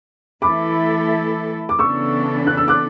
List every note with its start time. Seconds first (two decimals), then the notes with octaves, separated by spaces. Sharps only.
0.42 E3 A3 E4 A4 B5 D6
1.69 D6
1.79 C#3 E3 B3 D4 A4 C#6 E6
2.47 F#6
2.57 E6
2.68 D6 F#6